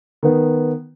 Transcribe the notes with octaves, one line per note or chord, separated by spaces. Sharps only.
D#3 B3